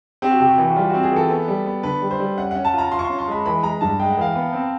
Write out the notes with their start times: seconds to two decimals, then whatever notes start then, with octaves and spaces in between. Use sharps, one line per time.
0.22 C4 G4
0.31 F#4
0.40 C3 G4
0.49 F#4
0.58 E3
0.70 F#4
0.76 G3 F4
0.90 C4 F#4
1.03 G#4
1.12 E3 A4
1.30 B3
1.48 G3
1.66 B3
1.83 D3 B4
2.02 G3
2.11 C5
2.19 G3
2.38 C#4 F#5
2.51 C#4 F#5
2.65 A5
2.73 F4 A#5
2.91 F4 C6
2.99 C#6
3.05 C#4 C6
3.19 C6
3.28 G#3 B5
3.46 E3 B5
3.63 G#3 A#5
3.81 G2 A5
3.99 G#3 G5
4.10 F#5
4.17 E3 F5
4.32 B3 F#5
4.53 C4